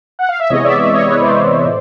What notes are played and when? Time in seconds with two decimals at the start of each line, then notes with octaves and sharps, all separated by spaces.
0.19 F#5
0.29 F5
0.40 E5
0.50 C3 E3 G#3 B3 C#5 D#5
0.64 D5 E5
0.79 D5 E5
0.93 C#5 D#5
1.08 B4 C#5
1.22 C5 D5
1.65 A2